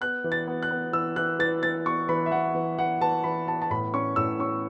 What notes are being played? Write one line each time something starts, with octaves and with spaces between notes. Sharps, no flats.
B3 F#6
E3
A6
B3
F#6
B3
E3 E6
E3 F#6
E3 A6
E3 A6
B3 C#6
E3 B5
E5
E3 F#5
E3
E3 F#5
E3 A5
E3 B5
B3 A5
A5
A2 B5
C#4 C#6
A2 E6
C#4 C#6